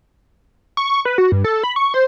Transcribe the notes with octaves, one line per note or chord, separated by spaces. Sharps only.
C#6
C#6
B4
F#4
G2
A4
B5
C#6
C5